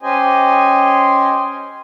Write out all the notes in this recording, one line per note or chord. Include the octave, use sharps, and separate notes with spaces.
C#4 G4 C5 D#5 G#5